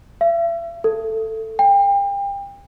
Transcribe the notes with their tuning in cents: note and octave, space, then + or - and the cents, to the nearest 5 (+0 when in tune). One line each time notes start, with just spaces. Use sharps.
E5 +40
A4 +10
G5 +30